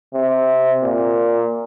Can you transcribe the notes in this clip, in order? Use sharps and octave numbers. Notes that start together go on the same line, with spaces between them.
C3
A#2